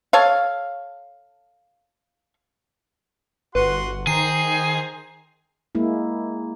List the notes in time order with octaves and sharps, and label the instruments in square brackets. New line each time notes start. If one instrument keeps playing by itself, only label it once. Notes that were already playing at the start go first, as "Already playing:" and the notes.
[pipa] A4 C#5 F5
[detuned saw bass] G1 [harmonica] F#4 F#5 C6 [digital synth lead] B4
[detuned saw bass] D#3 [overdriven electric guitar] G#4 [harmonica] C5 G5 A#5 [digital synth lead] C7
[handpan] G#3 A#3 E4